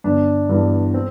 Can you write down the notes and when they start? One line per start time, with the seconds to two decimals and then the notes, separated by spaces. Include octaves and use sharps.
0.04 G1 D4
0.49 G2 E3 B3
0.94 C4